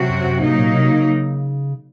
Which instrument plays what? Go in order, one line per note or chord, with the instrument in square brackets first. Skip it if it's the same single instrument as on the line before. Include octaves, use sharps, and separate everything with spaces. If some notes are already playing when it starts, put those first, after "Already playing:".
Already playing: [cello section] C3 F#3 C4 F#4
[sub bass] F#2
F#2
[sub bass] G#2 [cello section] F#3 A#3 D#4
[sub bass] A#2
C3
C#3